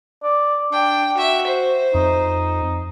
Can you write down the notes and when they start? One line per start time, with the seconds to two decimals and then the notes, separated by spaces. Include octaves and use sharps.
0.23 D5
0.72 D4 G5
1.17 F#4 E5
1.46 C5
1.94 F2 D#4